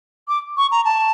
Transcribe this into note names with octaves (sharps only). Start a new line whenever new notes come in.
D6
C#6
A#5
A5